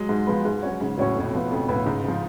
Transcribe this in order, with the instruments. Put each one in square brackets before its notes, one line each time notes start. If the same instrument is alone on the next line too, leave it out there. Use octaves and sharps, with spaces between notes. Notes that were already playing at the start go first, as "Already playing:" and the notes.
Already playing: [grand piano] F#3 G#3
[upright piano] G#2
F3 G#3 B3
G#2
F#3 C#4 F#4 C#5
[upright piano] G#2 [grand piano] C#3
[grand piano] A2 [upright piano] F#3 C#4 F#4 C#5
[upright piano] F2 [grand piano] A2
[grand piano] B2
[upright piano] F3 B3
[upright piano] F2 [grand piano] C#3
[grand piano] A2 [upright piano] F3 B3
[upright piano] C#2 [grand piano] G#2
[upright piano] C#3 F3